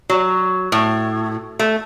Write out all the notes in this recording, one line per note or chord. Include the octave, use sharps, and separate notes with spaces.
F#3
A2
A3